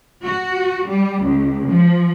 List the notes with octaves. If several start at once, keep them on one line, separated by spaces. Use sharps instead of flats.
F#4
G3
C#2
F3